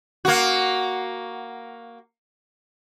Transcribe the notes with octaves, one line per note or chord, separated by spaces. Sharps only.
A#3 F#4